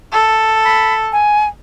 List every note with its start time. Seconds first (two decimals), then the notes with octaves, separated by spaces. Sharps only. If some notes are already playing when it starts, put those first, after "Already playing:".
0.12 A4
0.64 B5
1.12 G#5